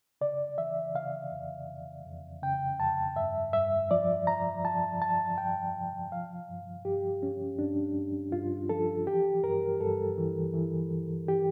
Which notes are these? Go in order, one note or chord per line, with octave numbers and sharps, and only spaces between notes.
C#3 D5
E3 E5
C#3 F5
F2
F2
F2
C#3 G5
F2 A5
G2 E5
G2 E5
F3 D5
F3 A#5
F3 A5
F3 A5
G2 G5
F3
F3 F5
G2
G2 G4
G2 C#4
G2 D4
G2
G2 F4
F3 A4
E3 G4
G2 A#4
G2 A4
E3
E3
E3
E3 G4